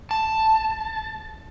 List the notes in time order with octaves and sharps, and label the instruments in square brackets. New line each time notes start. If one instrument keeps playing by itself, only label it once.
[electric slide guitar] A5